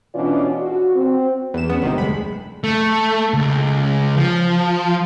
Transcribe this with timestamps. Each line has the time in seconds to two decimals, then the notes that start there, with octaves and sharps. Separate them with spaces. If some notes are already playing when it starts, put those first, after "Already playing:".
0.14 B2 E3 C#4 D4 F4 D5
0.61 F#4
0.95 C4
1.54 E2 E7
1.69 B3 C#4 C#5
1.82 G1 C3 D#3 C4
1.98 D2 G#3 B5
2.64 A3
3.34 C#2
4.16 F3